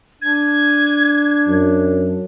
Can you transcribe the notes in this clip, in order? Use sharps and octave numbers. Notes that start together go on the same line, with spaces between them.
D4 G#6
F#2